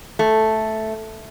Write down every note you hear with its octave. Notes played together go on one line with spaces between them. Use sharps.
A3